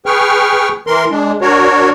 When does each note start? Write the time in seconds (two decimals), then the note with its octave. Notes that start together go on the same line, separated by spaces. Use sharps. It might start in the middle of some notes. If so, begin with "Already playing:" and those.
0.06 G#4 B4 G5 C#6 F6
0.87 E3 A#4 C6
1.11 G#3 D4
1.41 D4 F#4 A#4 C#5